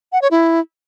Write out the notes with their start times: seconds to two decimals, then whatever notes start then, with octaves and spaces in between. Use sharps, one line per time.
0.12 F#5
0.22 C#5
0.31 E4